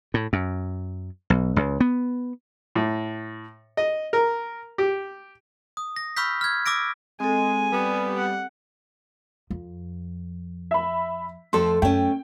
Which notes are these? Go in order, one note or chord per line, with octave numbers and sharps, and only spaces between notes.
A2
F#2
B1
C#2
B3
A2
D#5
A#4
G4
D#6
A#6
B5 C#6 E6 F6 G6 B6
F6 G#6
D6 E6 A#6 D7
G#3 C4 A4 G#5
G3 B3
F#5
F2
E5 B5
F2 A3 A4 C6
F#2 A3 C#4 G5